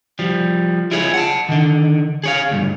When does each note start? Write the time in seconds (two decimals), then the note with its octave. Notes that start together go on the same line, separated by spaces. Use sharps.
0.19 F3 G3
0.91 E4 F4 G#4 C#5
1.14 F#5 A5
1.49 D3 D#3
2.24 G#4 C#5 F5
2.51 D2 G2